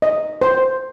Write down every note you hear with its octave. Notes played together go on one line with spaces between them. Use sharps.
D#5
C5